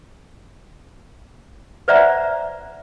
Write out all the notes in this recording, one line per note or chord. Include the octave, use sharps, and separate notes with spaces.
B4 C5 D5 E5 F#5 A#5